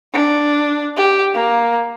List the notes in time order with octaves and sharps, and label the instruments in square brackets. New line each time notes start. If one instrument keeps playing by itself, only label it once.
[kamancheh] D4
G4
A#3